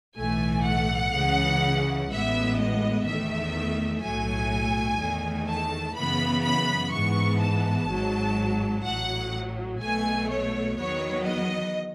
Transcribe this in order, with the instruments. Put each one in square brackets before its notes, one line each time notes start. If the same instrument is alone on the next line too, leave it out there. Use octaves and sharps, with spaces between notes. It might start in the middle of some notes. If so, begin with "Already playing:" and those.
[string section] B1 A2 E3 A3 G#5
F#5
C#2 C#3 E3
A1 A2 G#3 B3 E5
D#5
E2 D#3 A3 E5
B1 A2 F#3 A3 G#5
E2 D#3 A3
A5
F#2 C#3 E3 B3 B5
B5
G#2 E3 B3 C#6
A5
G#1 G#2 F#3
A1 A2 F#3 F#5
B1 B2 A3 G#5
C#5
E2 D#3 F#3 B3 C#5
D#5